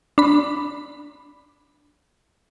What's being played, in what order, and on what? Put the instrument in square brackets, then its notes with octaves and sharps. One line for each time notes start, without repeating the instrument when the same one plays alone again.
[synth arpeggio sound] D4 B5